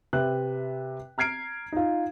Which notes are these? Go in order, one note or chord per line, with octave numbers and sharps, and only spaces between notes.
C3 B4 E5 F#6
A#5 F6 G#6 C7 D7
D#4 F4